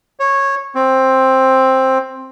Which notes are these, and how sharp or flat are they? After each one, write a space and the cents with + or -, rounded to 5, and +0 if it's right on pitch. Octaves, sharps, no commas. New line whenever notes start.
C#5 -15
C4 +10